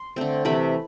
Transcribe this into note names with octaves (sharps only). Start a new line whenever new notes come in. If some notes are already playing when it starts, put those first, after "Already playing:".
Already playing: C6
D3 A3 C4
C3 E3 A3 B5